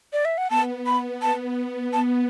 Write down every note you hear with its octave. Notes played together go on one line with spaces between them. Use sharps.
D5
E5
F#5
B3 A5
B5
A5
A5